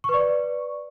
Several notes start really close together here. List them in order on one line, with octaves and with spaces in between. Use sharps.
C#6 B4 D5